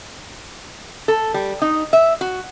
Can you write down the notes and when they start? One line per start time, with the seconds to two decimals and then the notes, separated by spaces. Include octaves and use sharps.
1.08 A4
1.34 G3
1.62 D#4
1.93 E5
2.21 F#4